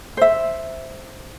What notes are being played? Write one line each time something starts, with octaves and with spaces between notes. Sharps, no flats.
C5 E5